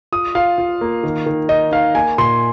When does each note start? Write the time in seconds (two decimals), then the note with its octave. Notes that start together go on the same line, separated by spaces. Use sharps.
0.12 F4 D#6
0.35 F4 F5
0.58 F4
0.81 A#3
1.03 D#3
1.26 D#3
1.49 D#4 D#5
1.72 D#4 F5
1.95 A#3 G#5
2.18 A#2 C6